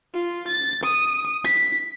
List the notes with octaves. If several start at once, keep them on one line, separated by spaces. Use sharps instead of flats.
F4
A6
D#6
B6